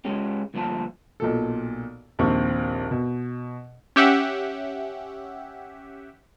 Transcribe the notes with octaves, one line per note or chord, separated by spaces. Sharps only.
G#3 C#4 G4
D2 G2 F3 A#3 A5
B1 A#2 A4
A#1 D#2 C4 C#6
B2
C#4 G4 E5 F#5